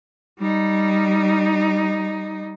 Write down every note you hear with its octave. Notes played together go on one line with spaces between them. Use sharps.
G3 D#4